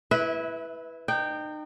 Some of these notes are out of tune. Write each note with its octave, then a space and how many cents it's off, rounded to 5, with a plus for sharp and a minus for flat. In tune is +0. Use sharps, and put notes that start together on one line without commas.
E4 +0 B4 +0 E5 -30
D#4 -35 G5 +0